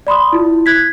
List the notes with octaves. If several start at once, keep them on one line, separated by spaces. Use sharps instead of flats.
D5 B5 C6 D#6
E4 F4
F#6 G#6 B6